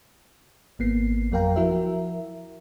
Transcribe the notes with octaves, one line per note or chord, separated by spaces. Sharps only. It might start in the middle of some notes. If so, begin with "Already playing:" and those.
G#1 A#3 B3 C7
F2 F#3 A#4 F5 G5 A#5
F3 E4 F#4 A#4 E5